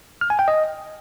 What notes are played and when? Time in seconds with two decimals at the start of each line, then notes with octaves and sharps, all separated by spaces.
0.21 F6
0.30 G#5
0.39 G5
0.48 D#5